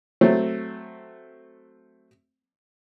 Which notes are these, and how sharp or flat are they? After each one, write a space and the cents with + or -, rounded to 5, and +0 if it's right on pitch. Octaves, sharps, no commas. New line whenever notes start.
F#3 +0 A3 +0 C4 +0